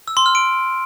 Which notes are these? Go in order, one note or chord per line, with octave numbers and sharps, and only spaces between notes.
E6
C6
F6
D7